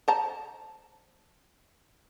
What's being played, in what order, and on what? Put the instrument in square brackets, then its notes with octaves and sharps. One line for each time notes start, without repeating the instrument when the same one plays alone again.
[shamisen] C5 A5 A#5